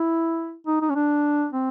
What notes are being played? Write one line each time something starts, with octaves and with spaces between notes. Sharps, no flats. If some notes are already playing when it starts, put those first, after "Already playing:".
Already playing: E4
D#4
D#4
C#4
D4
C4